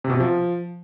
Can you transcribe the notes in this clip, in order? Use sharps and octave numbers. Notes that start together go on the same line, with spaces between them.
C3
B2
C3
F3